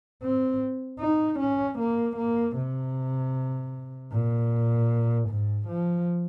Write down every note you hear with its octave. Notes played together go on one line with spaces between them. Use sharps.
C4
D#4
C#4
A#3
A#3
C3
A#2
G#2
F3